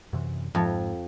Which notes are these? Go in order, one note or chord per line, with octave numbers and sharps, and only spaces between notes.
F#2 C3 E3
F2 G#2